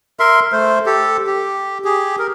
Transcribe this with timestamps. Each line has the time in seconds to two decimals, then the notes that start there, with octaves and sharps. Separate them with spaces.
0.20 A#4 E5 C6
0.52 A3 C5
0.86 G4 A4
1.27 G4
1.84 G4 G#4
2.19 A#4